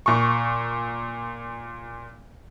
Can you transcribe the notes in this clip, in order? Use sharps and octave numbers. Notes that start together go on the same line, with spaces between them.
A#2 C#6